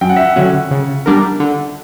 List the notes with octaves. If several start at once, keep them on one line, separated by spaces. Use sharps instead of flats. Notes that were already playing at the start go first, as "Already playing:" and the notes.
F#2 G5
F#5
E5
F#5
D3 F#3 C#4 F#4
C#3
G3 B3 D4 A#4
D3